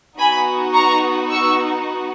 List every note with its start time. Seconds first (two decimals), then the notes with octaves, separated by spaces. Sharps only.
0.18 B3 D#4 F#4 G#5 B5
0.74 A#5 C#6
1.30 C#6 E6